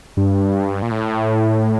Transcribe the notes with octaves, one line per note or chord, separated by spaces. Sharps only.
G2
A#2
A2